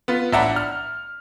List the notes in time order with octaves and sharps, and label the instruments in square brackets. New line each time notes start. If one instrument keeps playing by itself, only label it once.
[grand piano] B3 F4
A1 D4 E5 F#5 A#5
F6